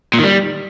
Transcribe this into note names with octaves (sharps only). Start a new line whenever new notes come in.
A#2
D#3
G3